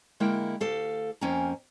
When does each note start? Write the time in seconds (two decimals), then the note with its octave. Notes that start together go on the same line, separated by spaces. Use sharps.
0.20 D3 G#3 A#3 E4 A#4 G5
0.61 D2 G4 A4 F5
1.21 F2 A#3 C#4 G5 G#5 A#5